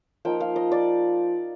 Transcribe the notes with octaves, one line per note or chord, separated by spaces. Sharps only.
F3 A#3 D#4 G5
F5
D#5
D5